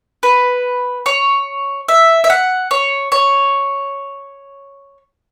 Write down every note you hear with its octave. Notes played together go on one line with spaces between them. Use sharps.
B4
C#5
E5
E5
F#5
C#5
C#5